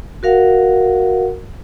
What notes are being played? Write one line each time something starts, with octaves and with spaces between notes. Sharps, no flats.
F#4 A#4 F5 F#5